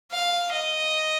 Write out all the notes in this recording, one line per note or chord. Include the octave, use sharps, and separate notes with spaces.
F5
D#5